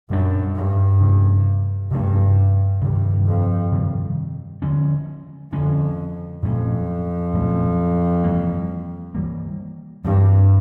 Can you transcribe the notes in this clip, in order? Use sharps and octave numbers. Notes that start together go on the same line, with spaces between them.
F#2 A#2 G3 B3 D4
G2
C3 F3 A3 C#4
G2 C3 F3 A3 C#4
G2 C3 D#3 G3
F2
C3 D#3 G3
D3 F3 G#3 C#4
F2 D3 F3 G#3 C#4
F2 A#2 F#3 A3 C#4
A#2 F#3 A3 C#4
E3 G3 A#3
E3 G3 A#3
G2 E3 G3 C4